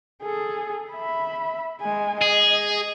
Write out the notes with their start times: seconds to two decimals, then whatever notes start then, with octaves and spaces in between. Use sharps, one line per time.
0.23 G#4 A4
0.92 E5 B5
1.80 G#3 G#5
2.22 G#4 D#5